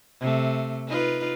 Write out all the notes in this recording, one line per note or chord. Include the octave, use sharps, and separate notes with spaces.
C3 A3
D#4 F4 B4